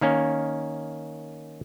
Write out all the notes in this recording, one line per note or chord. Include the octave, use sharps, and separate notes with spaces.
D#3 A#3 C#4